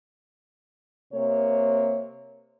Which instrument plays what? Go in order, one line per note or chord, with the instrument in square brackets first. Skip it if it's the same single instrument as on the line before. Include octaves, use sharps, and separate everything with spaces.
[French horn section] C3 A#3 C#5